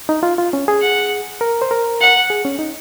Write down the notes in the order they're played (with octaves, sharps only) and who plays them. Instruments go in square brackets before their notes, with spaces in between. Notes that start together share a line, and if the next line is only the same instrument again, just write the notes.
[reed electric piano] D#4
F4
F4
C#4
G#4
[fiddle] F#5
[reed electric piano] A#4
C5
A#4
[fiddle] F#5
[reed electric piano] G#4
C#4
D#4